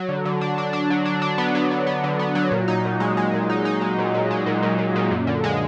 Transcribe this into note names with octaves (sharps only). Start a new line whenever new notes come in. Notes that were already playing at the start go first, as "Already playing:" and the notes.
Already playing: F#3
D3
D3
D4
D4
D4
F#3
D4
D4
B3
F#3
F#3
B3
D3
B3
F#3
A#2
D#4
A#2
G#3
G#3
A#2
D#4
D#4
G#3
A#2
A#2
G#3
A#2
A#2
A#2
A#2
F#2
D3
G#3